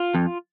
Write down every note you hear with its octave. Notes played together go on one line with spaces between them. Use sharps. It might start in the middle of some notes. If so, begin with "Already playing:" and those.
Already playing: F4
F2